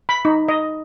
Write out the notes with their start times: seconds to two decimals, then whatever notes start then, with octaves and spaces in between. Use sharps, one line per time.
0.09 B5
0.25 D#4
0.48 D#5